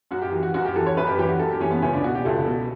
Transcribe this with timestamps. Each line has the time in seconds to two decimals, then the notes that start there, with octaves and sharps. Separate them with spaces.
0.11 F#2 F#4
0.22 G4
0.32 E3
0.43 F#4
0.54 F#2 F#4
0.65 G4
0.76 E3 A4
0.86 C#5
0.97 F#2 B4
1.07 G4
1.18 E3 G4
1.29 F#4
1.39 F#2 A4
1.51 G4
1.60 E3 C#4
1.71 B3
1.82 C#2 C#4
1.93 D4
2.03 B2 F#4
2.15 G4
2.25 C#2 A4
2.46 B2